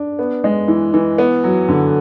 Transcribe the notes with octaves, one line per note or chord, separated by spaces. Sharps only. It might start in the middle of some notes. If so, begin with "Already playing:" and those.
Already playing: D4
B3
G#3
E3
E3
B3
F#3
D3